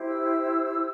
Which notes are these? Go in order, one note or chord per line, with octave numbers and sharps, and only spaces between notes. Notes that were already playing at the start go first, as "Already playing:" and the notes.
Already playing: E4 G4 C5
E6